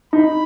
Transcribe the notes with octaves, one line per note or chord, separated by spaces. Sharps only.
D#4 B5